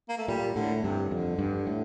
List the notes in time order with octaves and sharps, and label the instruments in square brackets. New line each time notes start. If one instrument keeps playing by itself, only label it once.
[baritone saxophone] A#3
A3
[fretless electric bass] A#2 [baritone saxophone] G3
[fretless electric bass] A2 [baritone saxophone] D3
[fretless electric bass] G2 [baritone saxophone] C3
[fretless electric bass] F2 [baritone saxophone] D3
[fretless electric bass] G2
A2